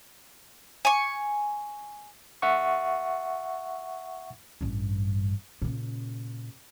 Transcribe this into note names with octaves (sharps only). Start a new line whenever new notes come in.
G#5 C#6
E5 F#5 C#6
A1 G2
A#2 C#3